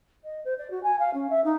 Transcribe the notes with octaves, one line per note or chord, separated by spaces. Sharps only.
D#5
C5
D5
F#4
G#5
F5
C#4
E5
D#4